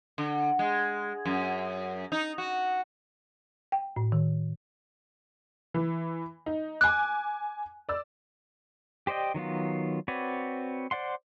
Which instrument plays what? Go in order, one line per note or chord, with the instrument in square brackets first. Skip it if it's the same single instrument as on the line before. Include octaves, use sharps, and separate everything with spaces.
[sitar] D3
G#3
F#2
D#4
F#4
[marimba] G5
A2
D#3
[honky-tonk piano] E3
D#4
[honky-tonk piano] G#5 D6 [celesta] F#6
[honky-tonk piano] D5 E6
[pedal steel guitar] G4 C5 D5 D#5 G5
D#3 F#3 B3 F4
C4 F#4 B4 C#5 D5
C5 D5 F#5 C6